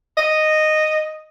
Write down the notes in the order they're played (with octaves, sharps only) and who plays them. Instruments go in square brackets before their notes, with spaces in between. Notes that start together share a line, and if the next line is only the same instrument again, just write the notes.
[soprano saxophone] D#5